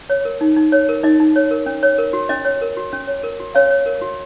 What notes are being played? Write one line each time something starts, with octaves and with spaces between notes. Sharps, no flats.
C#5
A#4
D#4
D#4
C#5
A#4
D#4 D#5
D#4
C#5
A#4
C#4
C#5
A#4
F#4
C#4 D#5
C#5
A#4
F#4
C#4
C#5
A#4
F#4
C#4 C#5 F5
C#5
A#4
F#4